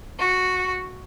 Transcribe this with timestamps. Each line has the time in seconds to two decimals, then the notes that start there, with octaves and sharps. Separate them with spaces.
0.20 F#4